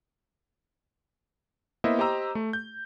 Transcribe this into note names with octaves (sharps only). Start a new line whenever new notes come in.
A#3 B3 E4 C5 D#5 E5
G4 C5 D#5 A#5 E6
A3
G6